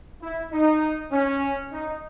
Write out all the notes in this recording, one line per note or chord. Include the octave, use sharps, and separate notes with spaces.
E4
D#4
C#4
D#4